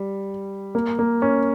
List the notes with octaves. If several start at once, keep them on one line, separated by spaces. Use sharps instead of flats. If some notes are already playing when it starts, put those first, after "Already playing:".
Already playing: G3
A#3
A#3
C#4